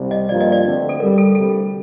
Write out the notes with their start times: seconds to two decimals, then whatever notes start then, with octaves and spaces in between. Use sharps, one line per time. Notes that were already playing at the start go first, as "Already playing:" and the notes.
Already playing: C2 C3 G3
0.11 D#5
0.29 G2 F3 A#3 F4 D5
0.41 D#5
0.52 D5
0.65 D2 D3 A3 C4
0.89 A4
1.00 G2 D3 G3 A#4
1.18 A4
1.35 D2 C3 G3 A4